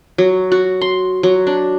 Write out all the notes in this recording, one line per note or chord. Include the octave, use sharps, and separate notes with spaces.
F#3
F#4
C6
F#3
D4